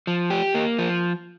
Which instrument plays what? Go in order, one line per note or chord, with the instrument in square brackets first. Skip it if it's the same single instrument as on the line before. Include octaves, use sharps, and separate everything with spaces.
[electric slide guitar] F3
G4
A#3
F3